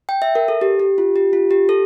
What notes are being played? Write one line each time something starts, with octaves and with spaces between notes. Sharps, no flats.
G5
E5
A#4
A4
G4
G4
F4
G4
F4
G4
A4